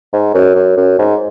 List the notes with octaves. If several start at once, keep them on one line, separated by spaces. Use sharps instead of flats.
G#2
F#2
F#2
F#2
G#2